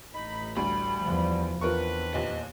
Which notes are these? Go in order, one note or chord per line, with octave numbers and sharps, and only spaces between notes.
A1 D#4 B5
D2 G3 B5
E2 F3
E2 C4 D4 F4 A#4 B4 C#6
D#2 A#2 D#5